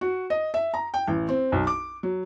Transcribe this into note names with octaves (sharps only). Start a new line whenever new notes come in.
F#4
D#5
E5
A#5
G5
A1
C4
B1
D6
F#3